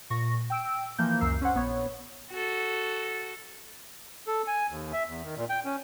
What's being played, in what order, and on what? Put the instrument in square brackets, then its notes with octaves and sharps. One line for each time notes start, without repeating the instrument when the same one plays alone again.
[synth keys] A#2 C#6 A#6
G5 E6 D7
E3 F3 A#3 G6
C#2 F#2 A#4 E6 C7
C#4 C5 F#5
A#1 B3 C#5
[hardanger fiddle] F#4 A4
[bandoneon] A4
G#5
D#2
E5
E2
D#3
A#2
G5
C#4